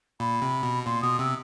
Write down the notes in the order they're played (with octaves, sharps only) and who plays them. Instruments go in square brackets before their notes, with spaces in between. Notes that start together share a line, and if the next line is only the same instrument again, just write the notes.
[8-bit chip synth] A#2 [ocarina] B5
[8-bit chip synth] C3
B2
[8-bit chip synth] A#2 [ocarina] C6
[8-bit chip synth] B2 [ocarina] D#6
[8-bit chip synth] C3 [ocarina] E6